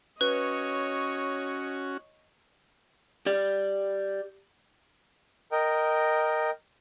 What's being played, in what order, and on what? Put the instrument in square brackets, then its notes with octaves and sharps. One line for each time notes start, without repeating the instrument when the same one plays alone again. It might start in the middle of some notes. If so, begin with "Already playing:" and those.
[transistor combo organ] C#4 F#4 [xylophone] B4 [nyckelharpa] C#5 D#5
[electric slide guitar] G4 D5
[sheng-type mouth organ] A#4 D#5 G5